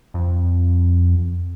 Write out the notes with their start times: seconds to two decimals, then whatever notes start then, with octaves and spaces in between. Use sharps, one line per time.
0.14 F2